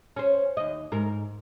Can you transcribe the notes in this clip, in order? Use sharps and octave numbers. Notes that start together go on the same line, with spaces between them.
C#4 C5
D#2 D#5
G#2 A#4